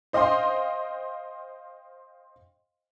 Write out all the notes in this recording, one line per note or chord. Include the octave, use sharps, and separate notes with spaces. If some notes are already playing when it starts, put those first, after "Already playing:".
C5 D#5 F5 G5 C6